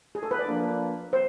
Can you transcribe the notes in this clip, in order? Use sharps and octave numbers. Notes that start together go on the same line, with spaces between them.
G#4
A4
B4
D5
F3 A#3 D4
C5